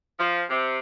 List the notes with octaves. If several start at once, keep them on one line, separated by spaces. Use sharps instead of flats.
F3
C3